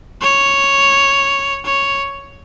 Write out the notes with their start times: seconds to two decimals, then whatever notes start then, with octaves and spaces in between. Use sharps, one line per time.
0.22 C#5
1.65 C#5